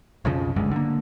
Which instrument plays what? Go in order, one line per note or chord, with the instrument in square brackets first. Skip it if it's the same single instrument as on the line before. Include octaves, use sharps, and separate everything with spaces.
[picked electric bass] B1 F2 C#3 F3
F#1 D2 G2 G#3
D3 A#3